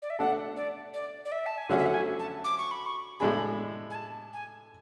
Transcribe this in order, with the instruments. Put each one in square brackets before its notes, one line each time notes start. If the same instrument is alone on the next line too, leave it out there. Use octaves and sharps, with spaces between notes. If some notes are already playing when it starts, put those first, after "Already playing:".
[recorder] D5
E5
[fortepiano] A3 D4 A4 [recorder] F#5
[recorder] D5
D5
D5
E5
A5
G#5
[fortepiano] D3 F#3 A3 C#4 F#4 [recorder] F#5
[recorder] E5
F#5
G#5
A5
D6
C#6
B5
C#6
[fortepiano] A2 G#3 D4 G#4 [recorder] B5
[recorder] G#5
A5
G#5